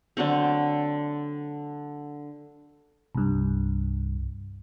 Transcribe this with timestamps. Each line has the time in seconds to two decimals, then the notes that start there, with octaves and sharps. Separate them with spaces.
0.17 D3 F#3 A3 C4
3.15 C2 G2